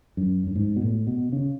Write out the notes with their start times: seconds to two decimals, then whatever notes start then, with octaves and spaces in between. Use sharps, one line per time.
0.17 F#2
0.47 F#2
0.56 G#2
0.76 B2
0.81 A2
1.07 B2
1.32 C#3